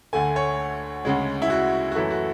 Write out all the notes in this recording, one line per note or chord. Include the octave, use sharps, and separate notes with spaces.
D2 D3 A3 G#5
C#5
D2 C#3 G#3
E4
F#4
F#4
F#2 E3 A3 E4
F#4